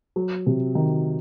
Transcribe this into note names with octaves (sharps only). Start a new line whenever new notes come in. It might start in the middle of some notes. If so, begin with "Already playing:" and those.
F#3
C3
D#3